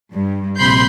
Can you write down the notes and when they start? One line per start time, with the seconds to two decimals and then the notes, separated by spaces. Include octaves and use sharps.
0.12 G2
0.56 A#1 C3 B5 C6 G6 C7